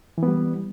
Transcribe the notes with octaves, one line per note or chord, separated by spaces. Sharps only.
E3 G3 B3